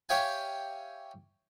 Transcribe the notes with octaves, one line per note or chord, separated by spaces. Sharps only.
G4 C#5 E5 F5 G5 G#5